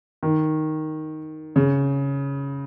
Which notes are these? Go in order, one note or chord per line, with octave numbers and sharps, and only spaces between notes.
D#3
C#3